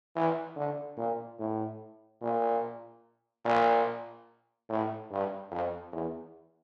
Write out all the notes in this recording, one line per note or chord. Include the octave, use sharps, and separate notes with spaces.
E3
D3
A#2
A2
A#2
A#2
A2
G2
F2
E2